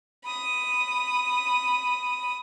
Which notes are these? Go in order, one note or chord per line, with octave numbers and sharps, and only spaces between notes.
B5 D#6